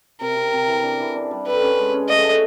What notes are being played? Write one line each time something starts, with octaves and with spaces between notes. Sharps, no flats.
C3 A#4
C3
C3
E3
D4
E3
D4
G3
A4 B4
C#4
G#3
C#4
A3 D#5
A3